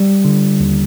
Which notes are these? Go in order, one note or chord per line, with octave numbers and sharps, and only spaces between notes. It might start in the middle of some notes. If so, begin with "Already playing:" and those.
Already playing: G3
D3
D#2